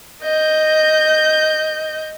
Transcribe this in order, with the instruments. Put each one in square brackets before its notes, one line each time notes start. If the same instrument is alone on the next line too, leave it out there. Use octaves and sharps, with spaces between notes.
[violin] D#5 G6